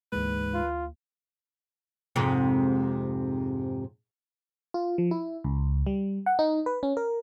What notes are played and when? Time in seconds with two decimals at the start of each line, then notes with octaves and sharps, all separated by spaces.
0.12 D2 G#2 E3 A#3 B4
0.54 F4
2.16 F2 G#2 C3
4.74 F4
4.98 F3
5.11 E4
5.44 C#2
5.87 G3
6.26 F#5
6.39 D#4
6.66 B4
6.83 C#4
6.97 A#4